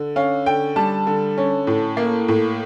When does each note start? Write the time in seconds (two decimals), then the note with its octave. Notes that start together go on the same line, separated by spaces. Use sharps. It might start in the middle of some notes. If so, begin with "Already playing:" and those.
Already playing: D3
0.16 C#4 F5
0.46 D3 G5
0.76 G3 A5
1.07 D3
1.38 C#4
1.67 A2
1.97 A#3
2.28 A2